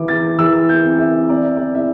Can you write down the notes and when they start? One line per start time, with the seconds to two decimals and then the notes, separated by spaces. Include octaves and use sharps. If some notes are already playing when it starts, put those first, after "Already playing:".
Already playing: E3 E4 D6
0.08 A6
0.38 E3 E6
0.69 G6
0.84 C4
0.98 E5
1.29 C4 D5
1.42 E5
1.57 D5
1.75 E4 E5